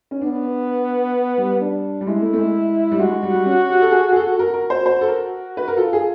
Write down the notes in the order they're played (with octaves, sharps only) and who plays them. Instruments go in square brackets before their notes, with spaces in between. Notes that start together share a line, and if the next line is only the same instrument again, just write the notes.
[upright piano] C#4
[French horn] B3 [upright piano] D4
[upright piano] G3
[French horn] D4
[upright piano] G3
[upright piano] G#3 [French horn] E4
[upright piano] A3
A3
G#3
G3
[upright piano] G#3 [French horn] F#4
[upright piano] G#3
G3
G3
C#4
G4
A4
G#4
G#4
A4
[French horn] F#4 [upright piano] A#4
[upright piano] A#4
C5
[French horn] F#4 [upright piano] C5
[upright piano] A4
A#4
B4
A#4
[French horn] F4 [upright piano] A4
[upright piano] G#4